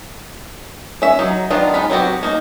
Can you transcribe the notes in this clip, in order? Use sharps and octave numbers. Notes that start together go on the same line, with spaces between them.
C#4 E5
F#3 D#4
D#3 F#3 B3 D4 F4
G#3 D#4 F4 B5
F#3 B3 C4 F#4 G4
A#3 D#4